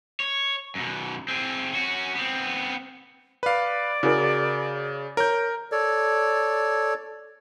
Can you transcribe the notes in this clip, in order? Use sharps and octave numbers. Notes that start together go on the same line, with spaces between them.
C#5
F#2 B2
C4 G#4
C#4 F#4
B3 C4
B4 D5 F5
C#3 F#4 G#4 A#4
A#4 C#5 G6
A4 C#5 D5